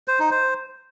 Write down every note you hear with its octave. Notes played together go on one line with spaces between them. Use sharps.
C5
D#4
C5